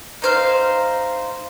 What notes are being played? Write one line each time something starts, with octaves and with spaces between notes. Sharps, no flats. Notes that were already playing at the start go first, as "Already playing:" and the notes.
D#4 C5 F5